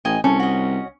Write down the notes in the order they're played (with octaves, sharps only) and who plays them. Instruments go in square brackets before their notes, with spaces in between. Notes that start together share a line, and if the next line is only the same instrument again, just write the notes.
[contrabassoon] A1 [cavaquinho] D#5 G5 G#5
[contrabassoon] C2 [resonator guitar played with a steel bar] C#4 [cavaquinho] A4
[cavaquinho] F#4 D#5